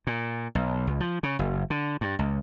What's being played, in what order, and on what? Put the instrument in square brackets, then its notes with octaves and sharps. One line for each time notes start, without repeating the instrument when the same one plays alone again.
[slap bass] A#2
B1
C#2
F3
C#3
F#1
D3
G2
C#2